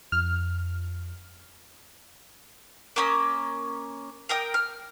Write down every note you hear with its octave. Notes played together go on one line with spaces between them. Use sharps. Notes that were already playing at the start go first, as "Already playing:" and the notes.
F2 F6
A#3 C#4 D#6
A#4 G5 D#6
F6